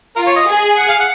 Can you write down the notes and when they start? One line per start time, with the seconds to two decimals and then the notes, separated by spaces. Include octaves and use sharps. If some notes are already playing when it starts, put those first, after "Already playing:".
0.16 F4 A#4
0.27 C#5
0.36 D#5
0.47 G#4
0.77 F#5
0.89 F5
1.00 F#5